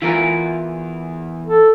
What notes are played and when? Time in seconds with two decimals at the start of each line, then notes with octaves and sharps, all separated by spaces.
0.02 E2 E4 F4 A#4
1.45 A4